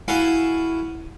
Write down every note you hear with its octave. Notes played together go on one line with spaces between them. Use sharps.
E4 F#4 A4 F5 G#5